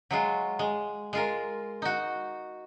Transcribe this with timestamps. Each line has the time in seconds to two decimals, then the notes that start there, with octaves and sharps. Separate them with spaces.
0.11 F#3 G#3 F4
0.59 G#3
1.13 G#3 F4 A#4
1.82 D#4 F#4